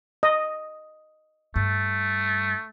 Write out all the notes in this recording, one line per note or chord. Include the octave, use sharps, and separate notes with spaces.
D#5
G2 A3